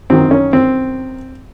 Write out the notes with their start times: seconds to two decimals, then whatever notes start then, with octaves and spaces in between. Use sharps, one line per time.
0.10 F#2 D#3 F#3 C4
0.31 C#4
0.53 C4